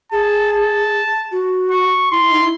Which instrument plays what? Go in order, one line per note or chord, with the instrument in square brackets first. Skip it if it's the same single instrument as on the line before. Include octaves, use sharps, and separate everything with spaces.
[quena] G#4 [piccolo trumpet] A5
[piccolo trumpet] A5
[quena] F#4
[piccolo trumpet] C#6
[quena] E4 [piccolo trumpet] C6
[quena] E4
D#4
E4